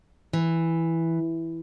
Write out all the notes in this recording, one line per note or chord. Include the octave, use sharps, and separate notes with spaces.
E3